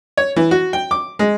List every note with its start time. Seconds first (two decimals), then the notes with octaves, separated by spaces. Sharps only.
0.17 C#5
0.36 E3
0.51 F#4
0.73 G5
0.91 D6
1.19 G#3